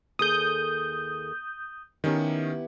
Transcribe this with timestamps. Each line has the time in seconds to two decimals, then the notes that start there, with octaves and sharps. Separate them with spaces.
0.19 D#2 G#4 A4 D#6 G6
2.04 D#3 B3 C#4 E4 G4